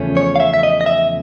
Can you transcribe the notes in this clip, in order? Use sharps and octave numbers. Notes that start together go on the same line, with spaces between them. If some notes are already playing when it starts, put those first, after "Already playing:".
Already playing: E2 C#3 F3 A3 C#4
C#5
F5
E5
E5
D#5
D#5
E5